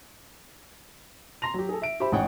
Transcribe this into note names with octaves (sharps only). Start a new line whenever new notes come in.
A#5 C6 A#6 F7
F#3 G4
G#4 A4
E5 D7
G4 C5 E5 B5
A1 G#2 G#4 C#5 F#5 G5